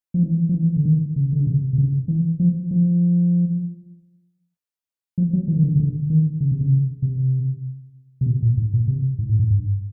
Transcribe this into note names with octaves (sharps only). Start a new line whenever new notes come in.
F3
E3
F3
E3
D3
D#3
C#3
D3
C#3
C3
C3
C#3
E3
F3
F3
F3
F#3
E3
D#3
D3
C#3
D3
D#3
C#3
C3
C#3
C3
C3
B2
A#2
G#2
A#2
C3
G#2
A2
G#2
G2